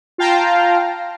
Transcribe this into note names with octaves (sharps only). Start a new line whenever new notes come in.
F4 F5 G5 A5 A#5